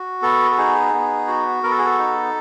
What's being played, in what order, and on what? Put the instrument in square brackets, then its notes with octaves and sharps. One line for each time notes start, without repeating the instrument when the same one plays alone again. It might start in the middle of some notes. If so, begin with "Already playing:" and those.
Already playing: [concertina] F#4
B3 A4
A4
D#4 G#4
B3
F#4
B3 A#4
A4
G#4
A4
D#4